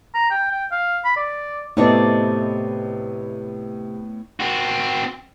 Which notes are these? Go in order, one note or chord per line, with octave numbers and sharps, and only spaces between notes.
A#5
G5
G5
F5
B5
D5
A2 C3 A3 B3 D#4 C#5 D5
C4 F#4